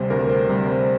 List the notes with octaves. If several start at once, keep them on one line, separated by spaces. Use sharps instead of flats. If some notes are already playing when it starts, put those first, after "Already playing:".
Already playing: D2 C3 G3 C5
D2 A#4
C5
C3 G3 A#4
C5